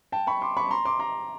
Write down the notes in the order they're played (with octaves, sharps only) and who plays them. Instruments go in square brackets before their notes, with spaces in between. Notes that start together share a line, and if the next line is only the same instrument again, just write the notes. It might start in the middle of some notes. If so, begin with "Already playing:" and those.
[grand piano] G5 A5
B5 C#6
C6 D6
B5 C#6
A#5 C6
C6 D6
A#5 C6